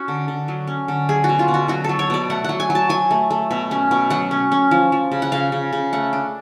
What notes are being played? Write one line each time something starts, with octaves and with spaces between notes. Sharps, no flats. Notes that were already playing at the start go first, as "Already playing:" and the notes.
Already playing: C#4 F#4
D3
D3
F#3
C#4
D3
F#3 G#4
F#4
B2
F4
B2
F#4
F#3 F#4
F#3 A4
C#5
B2 D5
A3 F#5
F#3 F#5
G#5
F#3
A5
F#3 G#5
A3
A3
B2
C#4
B2
F#3 F#5
C#4
C#4
F3
F3
C#3
F#5
C#3 F5
C#3
C#3
A3 F#5
D4